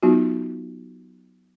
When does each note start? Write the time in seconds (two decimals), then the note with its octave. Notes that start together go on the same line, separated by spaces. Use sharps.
0.03 F#3 B3 D#4 F4 F#4